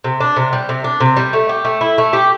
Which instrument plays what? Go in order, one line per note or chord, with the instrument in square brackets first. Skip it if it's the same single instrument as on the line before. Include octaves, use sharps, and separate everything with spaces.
[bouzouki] C3
D4
C3
G3
C3
D4
C3
G3
A3
G4
A3
E4
A3
G4